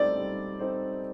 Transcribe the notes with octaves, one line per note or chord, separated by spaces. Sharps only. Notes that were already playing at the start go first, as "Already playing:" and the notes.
Already playing: G3 C4 D#4 A4 C5 D5
G3
C4 D#4 A4 C5